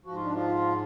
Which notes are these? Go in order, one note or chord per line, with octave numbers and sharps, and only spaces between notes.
G#2 F3 F#4
F4
D4
F3 F4